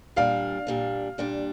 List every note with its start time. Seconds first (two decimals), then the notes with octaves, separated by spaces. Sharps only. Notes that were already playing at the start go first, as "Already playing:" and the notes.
0.16 A#2 G3 D4 F5
0.67 A#2 G3 D4
1.18 A#2 G3 D4